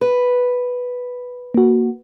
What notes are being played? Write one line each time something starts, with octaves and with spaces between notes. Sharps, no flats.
B4
A#3 F#4